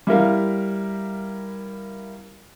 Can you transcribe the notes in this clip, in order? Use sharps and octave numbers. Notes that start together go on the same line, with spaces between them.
G3 E4 A#4 F5